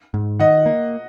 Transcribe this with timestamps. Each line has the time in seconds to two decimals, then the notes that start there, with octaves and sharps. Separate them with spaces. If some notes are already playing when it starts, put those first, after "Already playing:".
0.14 G#2
0.39 D#3 D#5 F#5
0.66 A#3